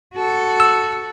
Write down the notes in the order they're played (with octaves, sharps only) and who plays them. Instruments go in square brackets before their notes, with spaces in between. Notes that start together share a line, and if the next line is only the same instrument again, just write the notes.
[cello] F#4 A4
[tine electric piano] E6